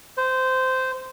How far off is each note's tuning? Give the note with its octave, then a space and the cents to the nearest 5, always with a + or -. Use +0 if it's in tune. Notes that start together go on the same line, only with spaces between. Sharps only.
C5 -15